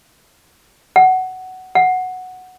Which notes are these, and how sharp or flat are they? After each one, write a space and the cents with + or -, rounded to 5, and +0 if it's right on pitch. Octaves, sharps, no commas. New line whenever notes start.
F#5 +10
F#5 -5